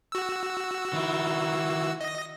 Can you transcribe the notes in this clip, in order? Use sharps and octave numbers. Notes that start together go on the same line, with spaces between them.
F#4 E6
D#3 E4
D#5 A#6